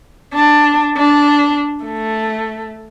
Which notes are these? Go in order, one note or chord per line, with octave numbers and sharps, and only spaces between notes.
D4
D4
A3